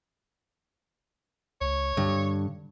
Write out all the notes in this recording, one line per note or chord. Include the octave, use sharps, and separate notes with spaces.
C#2 C#5
G2 D3